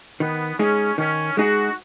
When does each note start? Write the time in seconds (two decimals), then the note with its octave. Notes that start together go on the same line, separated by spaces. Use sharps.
0.20 D#3 B3
0.59 G#3 C#4 D#4 G#4
0.98 D#3 C#4
1.37 G#3 D#4 F#4 G#4